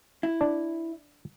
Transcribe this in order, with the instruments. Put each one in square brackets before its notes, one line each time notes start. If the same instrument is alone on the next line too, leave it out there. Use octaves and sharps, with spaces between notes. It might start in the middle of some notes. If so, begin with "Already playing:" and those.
[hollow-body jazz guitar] E4
[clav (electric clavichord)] D4